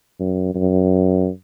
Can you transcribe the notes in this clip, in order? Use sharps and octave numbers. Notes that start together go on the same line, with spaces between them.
F#2
F#2